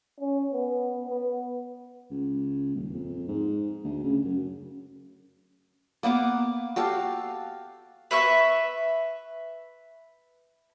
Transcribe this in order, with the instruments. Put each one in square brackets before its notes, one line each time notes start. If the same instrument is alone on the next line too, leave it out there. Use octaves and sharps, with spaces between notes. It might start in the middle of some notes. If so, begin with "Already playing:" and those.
[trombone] C#4
B3
B3
[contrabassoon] C#2
D#1
F2
G#2
D2
C#3
F#2
[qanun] A#3 B3 F#5 D6
F#4 G4 A4 F5
[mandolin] B4 E5 C#6